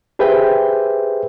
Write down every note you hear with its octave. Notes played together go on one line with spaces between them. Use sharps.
G4 G#4 B4 C5 E5 G5